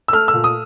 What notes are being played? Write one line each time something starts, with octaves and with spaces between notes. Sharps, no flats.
E6
A3 F6
E6
A#2
D#6